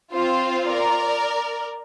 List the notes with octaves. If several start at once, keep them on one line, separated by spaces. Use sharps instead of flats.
C4 F4 C5
A#4 D5